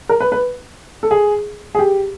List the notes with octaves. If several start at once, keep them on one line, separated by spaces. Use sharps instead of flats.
A#4
B4
B4
A4
G#4
G#4
G4